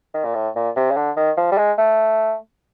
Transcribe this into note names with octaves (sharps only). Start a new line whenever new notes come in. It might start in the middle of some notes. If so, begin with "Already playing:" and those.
D#3
A#2
A2
A#2
C3
C#3
D3
D#3
F3
G3
G#3
A3